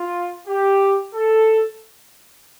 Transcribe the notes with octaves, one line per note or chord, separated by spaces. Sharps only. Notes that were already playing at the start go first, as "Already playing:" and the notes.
Already playing: F4
G4
A4